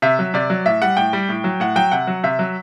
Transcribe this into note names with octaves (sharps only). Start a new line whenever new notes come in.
C3 E5
F#3
C3 D5
F#3
A2 E5
G3 F#5
A2 G5
G3
A2
F#3
A2 F#5
F#3 G5
C3 F#5
F#3
C3 E5
F#3